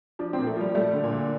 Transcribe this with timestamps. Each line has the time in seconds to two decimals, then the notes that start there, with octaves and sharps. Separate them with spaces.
0.19 F3 D4
0.33 C4
0.38 A#2
0.47 A3
0.56 F3 G3
0.75 G3 A3
0.93 D3
1.04 A#2
1.12 D3